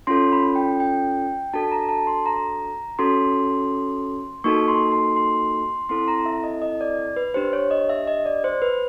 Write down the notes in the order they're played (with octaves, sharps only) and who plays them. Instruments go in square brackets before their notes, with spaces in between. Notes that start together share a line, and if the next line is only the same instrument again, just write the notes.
[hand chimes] C#4 F4 A4 C6
B5
G5
G5
D4 F#4 A4 A5
A#5
A5
C6
A#5
C#4 F#4 A4 C6
A#3 D#4 F#4 A4 C#6
C6
C6
C6
C4 E4 A4 C6
A#5
E5
D#5
D#5
D5
B4
D4 G4 C5
C#5
D#5
E5
D#5
D5
C5
B4